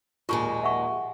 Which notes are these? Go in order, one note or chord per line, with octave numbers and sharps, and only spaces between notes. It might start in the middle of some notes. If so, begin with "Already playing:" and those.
D#2 A#2 G#3 F4 C#6
E5 F#5 C#6